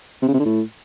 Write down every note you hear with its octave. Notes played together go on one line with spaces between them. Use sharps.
C3
C#3
C3
D3
A2